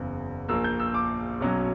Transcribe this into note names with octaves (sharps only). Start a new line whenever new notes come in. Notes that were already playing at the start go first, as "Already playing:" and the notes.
Already playing: F#1 E2 C#3
A#1 A#2 A#3 E6
G6
E6
D6
B1 B2 F#3 C#4